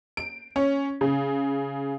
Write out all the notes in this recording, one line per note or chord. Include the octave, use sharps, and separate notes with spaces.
D7
C#4
C#3